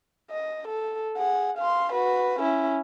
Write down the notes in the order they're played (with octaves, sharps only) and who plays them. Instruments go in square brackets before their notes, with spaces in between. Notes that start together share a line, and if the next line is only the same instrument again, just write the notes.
[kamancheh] D#5
A4
G#4 F#5
F5 C6
F#4 B4
C#4 E4